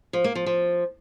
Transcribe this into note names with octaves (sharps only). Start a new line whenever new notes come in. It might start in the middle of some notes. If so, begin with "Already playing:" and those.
F3
A#3
F3
F3